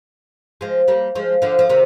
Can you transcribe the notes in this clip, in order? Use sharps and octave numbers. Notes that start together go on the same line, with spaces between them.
F3 G#3
G3 A#3
F3 G#3
D3 F3
F3
C3 D#3